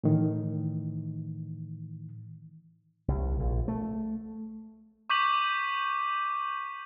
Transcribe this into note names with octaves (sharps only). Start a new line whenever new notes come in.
A2 D#3 E3
C2
A#1
A3
C#6 D6 G6 B6 D#7 F#7